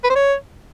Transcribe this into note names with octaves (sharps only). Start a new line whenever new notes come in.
B4
C5
C#5